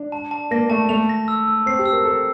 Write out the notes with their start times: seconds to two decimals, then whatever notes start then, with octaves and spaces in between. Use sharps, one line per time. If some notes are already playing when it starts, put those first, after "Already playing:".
Already playing: D4
0.12 A5
0.31 A5
0.51 A#3 A#6
0.70 A3 A5
0.89 A3 F7
1.09 A#6
1.28 E6
1.48 E6
1.66 C4 C7
1.79 G4
1.86 E6
1.93 A#4
2.05 A4 E6